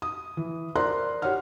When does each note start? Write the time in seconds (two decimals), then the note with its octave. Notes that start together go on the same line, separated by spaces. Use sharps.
0.02 D#6
0.37 E3
0.75 A#4 C5 D5 A#5 C6 F#6
1.22 F#4 G4 C#5 F#5 F6